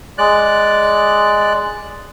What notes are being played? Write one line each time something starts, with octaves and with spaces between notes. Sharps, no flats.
G#3 D5 F#6